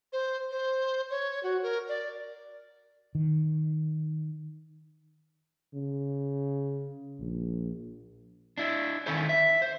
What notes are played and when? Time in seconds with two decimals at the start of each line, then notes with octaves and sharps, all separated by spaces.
0.13 C5
0.51 C5
1.10 C#5
1.43 F#4
1.63 A#4
1.89 D5
3.15 D#3
5.74 C#3
7.20 A#1
8.58 D4 E4
9.06 D#3 C#4 E4 A4 C5
9.29 E5
9.62 C5